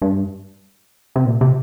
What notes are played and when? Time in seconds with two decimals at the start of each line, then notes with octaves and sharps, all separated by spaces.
0.02 G2
1.16 C3
1.25 A#2
1.41 C3